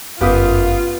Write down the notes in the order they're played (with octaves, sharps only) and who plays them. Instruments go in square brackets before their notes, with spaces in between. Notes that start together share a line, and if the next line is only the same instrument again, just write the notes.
[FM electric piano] G1 F5 D#6 [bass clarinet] F#2 [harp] B3 G4 [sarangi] F4